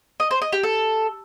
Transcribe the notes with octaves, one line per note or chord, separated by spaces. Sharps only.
D#5
C5
D#5
G4
A4